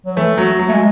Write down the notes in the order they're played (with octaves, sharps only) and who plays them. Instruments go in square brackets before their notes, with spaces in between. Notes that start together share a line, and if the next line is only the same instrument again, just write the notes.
[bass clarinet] F#3
[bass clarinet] E3 [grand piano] A3
[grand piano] F#3
F#3
[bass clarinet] A3
G#3